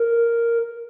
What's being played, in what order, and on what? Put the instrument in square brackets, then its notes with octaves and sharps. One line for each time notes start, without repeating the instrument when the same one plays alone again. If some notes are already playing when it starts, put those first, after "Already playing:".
Already playing: [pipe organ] A#4